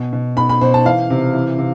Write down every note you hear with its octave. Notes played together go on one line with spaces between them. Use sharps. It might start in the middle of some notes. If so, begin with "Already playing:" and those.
Already playing: B2
B2
B2 B5
B5
B2 C5
A5
E3 F5
C3
E3
C3